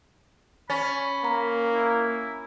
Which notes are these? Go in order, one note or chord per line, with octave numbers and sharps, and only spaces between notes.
C#4 B5 A6
A#3 A#5
E4